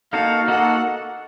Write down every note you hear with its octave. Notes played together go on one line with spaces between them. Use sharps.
A#3 D#4 F#4 A4 F5
A#3 D#4 F#4 A4 F#5